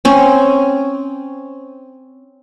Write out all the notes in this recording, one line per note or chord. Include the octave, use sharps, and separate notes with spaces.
C4 C#4